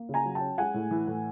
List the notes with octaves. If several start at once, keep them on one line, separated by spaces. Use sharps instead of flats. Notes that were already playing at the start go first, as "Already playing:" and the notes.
Already playing: A#3
C#3
G#5 A#5
F#3
G5 A5
C#4
G#3 F#5 G#5
A2
E3
A2